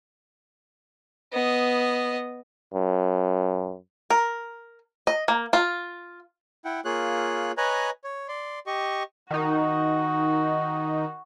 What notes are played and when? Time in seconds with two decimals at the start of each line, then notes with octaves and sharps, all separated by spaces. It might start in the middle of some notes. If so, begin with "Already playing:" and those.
1.33 B3 D#5
2.73 F#2
4.10 A#4
5.07 D#5
5.28 A#3
5.53 F4
6.65 E4 F#5 G5
6.85 A#3 F4 G#4 C#5 F#6
7.57 B4 C#5 D#5 G#5 A#5 F#6
8.04 C#5
8.28 D5 C6
8.67 G4 D#5 C#6
9.31 D#3 D#4 F#4